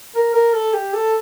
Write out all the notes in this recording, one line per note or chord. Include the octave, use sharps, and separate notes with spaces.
A#4
A#4
A4
G4
A4